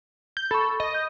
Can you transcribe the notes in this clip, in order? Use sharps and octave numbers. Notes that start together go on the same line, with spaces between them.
G6
A4 B5 C#6
D#5
G6